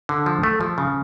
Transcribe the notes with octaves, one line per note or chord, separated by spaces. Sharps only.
D3
F3
A3
F3
C#3